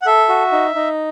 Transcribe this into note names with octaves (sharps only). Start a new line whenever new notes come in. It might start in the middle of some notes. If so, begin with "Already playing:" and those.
F#5
A4 E5
F#4
D#4
D#4